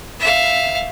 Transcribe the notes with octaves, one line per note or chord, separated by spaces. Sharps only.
E5 F5